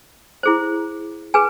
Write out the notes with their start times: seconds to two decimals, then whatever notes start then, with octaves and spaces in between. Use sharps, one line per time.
0.43 E4 G#4 C5
1.34 G#4 B4 G#5